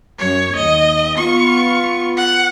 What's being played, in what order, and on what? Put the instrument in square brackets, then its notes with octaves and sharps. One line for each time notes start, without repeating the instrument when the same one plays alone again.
[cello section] F#2 [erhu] C#5
[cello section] D#2 [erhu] D#5
[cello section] B3 F4 [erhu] C#6
[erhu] F#5